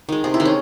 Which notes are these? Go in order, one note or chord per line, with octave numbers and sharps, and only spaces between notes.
D#3 G#3
C3 G#4
E4
D#3 G#3
C#4